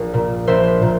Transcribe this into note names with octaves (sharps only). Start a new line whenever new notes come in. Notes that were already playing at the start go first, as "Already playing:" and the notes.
Already playing: A#1
A#2
A#1 C5 E5
A#2